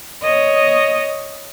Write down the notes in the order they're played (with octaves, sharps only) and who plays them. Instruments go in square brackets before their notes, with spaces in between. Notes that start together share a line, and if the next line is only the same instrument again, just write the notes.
[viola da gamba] C#5 D#5